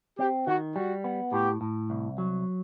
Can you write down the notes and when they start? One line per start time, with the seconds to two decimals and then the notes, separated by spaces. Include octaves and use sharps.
0.19 C4 G4
0.47 D#3 F#4
0.76 G3 F#4
1.04 B3
1.33 A2 G4
1.61 A2
1.90 C2
2.18 F#3